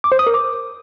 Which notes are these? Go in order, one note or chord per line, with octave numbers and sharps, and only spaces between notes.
D6
C5
D#6
A#4
D6